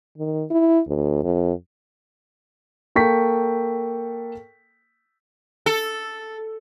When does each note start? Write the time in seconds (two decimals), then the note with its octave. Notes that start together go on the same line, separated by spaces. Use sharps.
0.18 D#3
0.51 E4
0.87 D2
1.24 F2
2.96 A#3 A4 G5 C#6 B6
5.66 A4